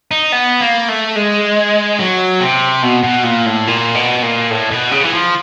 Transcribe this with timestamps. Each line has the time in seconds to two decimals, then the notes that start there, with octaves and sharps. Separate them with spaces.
0.11 D#4
0.33 B3
0.61 A#3
0.88 A3
1.16 G#3
1.99 F#3
2.41 C3
2.83 B2
3.04 B2
3.25 A#2
3.46 A2
3.67 A#2
3.94 B2
4.23 A#2
4.50 A2
4.71 B2
4.92 C#3
5.04 E3
5.13 F3